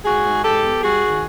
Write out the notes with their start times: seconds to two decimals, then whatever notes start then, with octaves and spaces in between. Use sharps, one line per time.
0.03 G#2 F#4 G#4
0.23 G#2
0.43 G#2 G4 A4
0.62 B3
0.82 G3 F#4 G#4
1.02 D#3